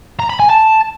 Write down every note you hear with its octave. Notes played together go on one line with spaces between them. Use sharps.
A#5
B5
G#5
A5